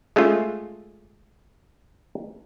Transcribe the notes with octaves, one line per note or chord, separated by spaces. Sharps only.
G#3 A3 C#4 F4